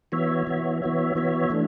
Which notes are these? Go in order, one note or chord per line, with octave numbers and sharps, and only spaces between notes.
E3 B3 F#4 C#5 E5
E3 B3 F#4 C#5 E5
E3 B3 F#4 C#5 E5
E3 B3 F#4 C#5 E5
E3 A3 D4